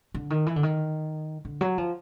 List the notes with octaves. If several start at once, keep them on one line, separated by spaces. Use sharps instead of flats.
D3
D#3
E3
D3
D#3
D3
F#3
F3